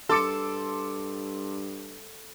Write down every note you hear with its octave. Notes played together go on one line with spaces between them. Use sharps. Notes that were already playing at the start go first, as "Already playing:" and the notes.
G2 A4 C6 D6 C#7